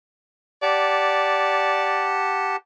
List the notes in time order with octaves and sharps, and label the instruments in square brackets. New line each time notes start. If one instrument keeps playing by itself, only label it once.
[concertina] G4 F#5 A5 [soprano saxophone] D5